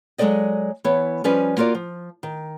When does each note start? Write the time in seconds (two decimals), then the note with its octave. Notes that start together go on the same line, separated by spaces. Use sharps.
0.18 F#3 G#3 A#3 A4 D5 D#5
0.84 E3 B3 C#5
1.24 F3 G3 C#4 B4 D5 G#5
1.57 A#3 F4 F#4 A#4 D5
1.75 F3
2.23 D#3